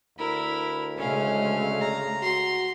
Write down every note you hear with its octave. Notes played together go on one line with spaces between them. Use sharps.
D2 E4 A#4 B5
C#3 G#3 A3 C#4 F5
A#5
F#4 C6